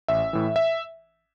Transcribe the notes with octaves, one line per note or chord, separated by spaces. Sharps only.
A1 E5
A2 E3
E5